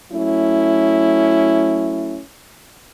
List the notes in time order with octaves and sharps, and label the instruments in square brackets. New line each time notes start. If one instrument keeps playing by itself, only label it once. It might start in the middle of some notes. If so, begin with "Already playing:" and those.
[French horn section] F#3 A3 C#4 E4